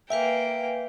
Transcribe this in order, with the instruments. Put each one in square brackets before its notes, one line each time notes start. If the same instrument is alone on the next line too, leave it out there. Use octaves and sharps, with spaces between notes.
[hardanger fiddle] A#3 G5 [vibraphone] B4 F5 G#5 [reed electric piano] E5